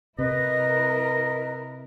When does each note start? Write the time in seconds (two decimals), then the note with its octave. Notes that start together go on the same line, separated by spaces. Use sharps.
0.19 C3 E4 A#4 B4 D#5